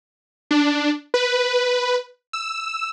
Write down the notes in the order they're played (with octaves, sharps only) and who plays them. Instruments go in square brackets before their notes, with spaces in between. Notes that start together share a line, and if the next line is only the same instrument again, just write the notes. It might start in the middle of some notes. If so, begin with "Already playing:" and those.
[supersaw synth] D4
B4
E6